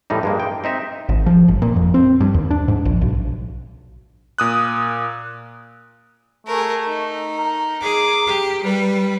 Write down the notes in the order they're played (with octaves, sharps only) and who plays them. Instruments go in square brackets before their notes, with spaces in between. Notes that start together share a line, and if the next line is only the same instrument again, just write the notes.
[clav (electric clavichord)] A2 E3 G3 D#4
G2 G#3 A#3
G5
C4 D#4 E5
[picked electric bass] G#1
F3
G1
A#2
F2
C4
G2
D#2
D4
G#2
A#1
B1
[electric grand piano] A#2 D#6 F#6
[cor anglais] A3 [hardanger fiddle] G#4 A#4
[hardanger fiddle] D#4
[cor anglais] A#4
[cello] G#4 [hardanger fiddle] D6
[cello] G4
[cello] G3 [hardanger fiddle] B4